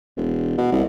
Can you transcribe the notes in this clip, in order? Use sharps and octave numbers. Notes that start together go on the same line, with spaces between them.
E1
B2
C2